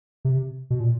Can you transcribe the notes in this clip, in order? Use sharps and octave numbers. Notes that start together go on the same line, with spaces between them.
C3
B2
A#2